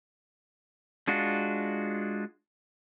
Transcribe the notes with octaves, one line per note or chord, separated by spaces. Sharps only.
G#3 D4 F4 F#4